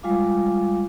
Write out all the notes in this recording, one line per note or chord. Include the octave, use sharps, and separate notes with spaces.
G3 G#3 F4 F5 D6